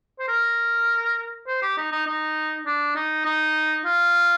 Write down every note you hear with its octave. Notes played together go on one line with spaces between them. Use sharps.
C5
A#4
C5
G4
D#4
D#4
D#4
D4
D#4
D#4
F4